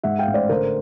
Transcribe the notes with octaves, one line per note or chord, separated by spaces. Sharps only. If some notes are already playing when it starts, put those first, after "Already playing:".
G#2 E5 F#5
F5 G5
A1
C5 D5
D3 A#4 C5